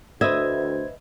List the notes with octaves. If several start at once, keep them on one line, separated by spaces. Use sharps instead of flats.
D2 B4 C5 D#5 E5 G#6